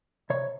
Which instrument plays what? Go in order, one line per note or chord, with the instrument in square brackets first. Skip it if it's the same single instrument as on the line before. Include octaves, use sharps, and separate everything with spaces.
[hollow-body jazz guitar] C3 C#5